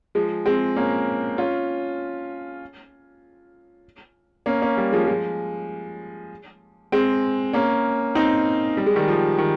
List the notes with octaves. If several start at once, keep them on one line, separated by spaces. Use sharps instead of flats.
F3 G#3
G#3 C4
A#3 C#4
C#4 F4
A#3 C#4
A#3 C#4
G3 A#3
F3 G#3
F3 G#3
G#3 C4
A#3 C#4
C4 D#4
G3
G#3
D#3 G3
F3
D#3